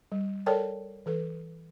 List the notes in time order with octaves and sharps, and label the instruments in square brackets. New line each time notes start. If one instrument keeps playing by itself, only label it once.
[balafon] G3
A4 A#4 C#5 D5 G5 A5
E3 A4 B4